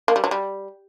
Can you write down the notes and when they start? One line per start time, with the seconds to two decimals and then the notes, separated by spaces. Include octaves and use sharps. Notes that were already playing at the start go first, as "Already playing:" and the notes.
0.08 A#3
0.16 G3
0.24 F#3
0.31 G3